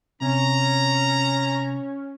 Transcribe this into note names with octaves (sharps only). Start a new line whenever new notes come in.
C3 C#4 A#5